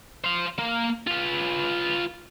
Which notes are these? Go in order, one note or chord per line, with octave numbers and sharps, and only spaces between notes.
C5 F5
A#3
F4 B4